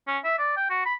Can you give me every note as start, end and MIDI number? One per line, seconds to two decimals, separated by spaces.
0.08 0.18 61
0.25 0.37 76
0.39 0.56 74
0.57 0.70 79
0.70 0.84 66
0.86 0.95 83